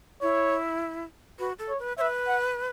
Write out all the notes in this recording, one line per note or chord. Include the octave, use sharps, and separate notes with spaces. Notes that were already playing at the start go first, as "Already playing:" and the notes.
E4 C#5
F#4 B4
A4
C#5
B4
B4 C#5 E5
F#5